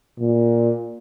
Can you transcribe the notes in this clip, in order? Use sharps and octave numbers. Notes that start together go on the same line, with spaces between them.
A#2